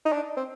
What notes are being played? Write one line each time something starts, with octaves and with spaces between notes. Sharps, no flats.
D#4
D4
C4